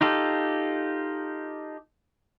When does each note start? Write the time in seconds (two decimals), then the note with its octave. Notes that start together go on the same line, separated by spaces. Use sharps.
0.01 D#4 F4 G4 A4